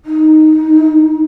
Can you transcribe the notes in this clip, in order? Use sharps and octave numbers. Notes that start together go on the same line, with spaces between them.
D#4